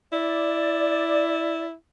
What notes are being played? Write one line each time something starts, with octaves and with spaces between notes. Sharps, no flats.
E4 D5